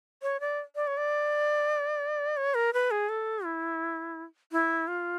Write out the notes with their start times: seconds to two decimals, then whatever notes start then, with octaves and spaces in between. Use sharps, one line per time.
0.22 C#5
0.40 D5
0.76 D5
0.87 C#5
0.97 D5
2.37 C#5
2.55 A#4
2.73 B4
2.91 G#4
3.09 A4
3.45 E4
4.52 E4
4.88 F4